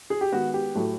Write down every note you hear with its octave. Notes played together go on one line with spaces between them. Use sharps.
G#4
G4
D#3 G#3 B3 F#4
G4
A2 F#3 A3